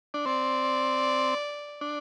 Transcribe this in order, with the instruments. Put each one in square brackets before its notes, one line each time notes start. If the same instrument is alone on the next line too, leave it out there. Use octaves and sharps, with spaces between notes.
[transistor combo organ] D4
[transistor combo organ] C4 [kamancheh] D5
[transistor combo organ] D4